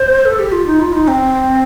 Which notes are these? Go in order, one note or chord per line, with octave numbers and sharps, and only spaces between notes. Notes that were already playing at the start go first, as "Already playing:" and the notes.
Already playing: C5
A4
G4
F4
D#4
F4
D#4
C4